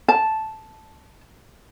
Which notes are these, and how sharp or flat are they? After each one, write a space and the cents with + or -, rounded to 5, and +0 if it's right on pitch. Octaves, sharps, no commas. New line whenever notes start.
A5 -5